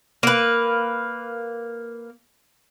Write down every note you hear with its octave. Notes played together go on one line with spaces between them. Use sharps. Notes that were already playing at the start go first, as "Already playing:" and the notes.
A#3 B4